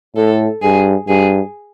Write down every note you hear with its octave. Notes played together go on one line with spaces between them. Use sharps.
A2 A4
G2 G#4
G2 G#4